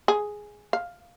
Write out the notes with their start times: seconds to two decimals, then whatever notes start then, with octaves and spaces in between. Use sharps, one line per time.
0.08 G#4
0.73 F5